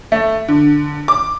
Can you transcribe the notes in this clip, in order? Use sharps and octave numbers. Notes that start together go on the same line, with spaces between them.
A3
D3
D6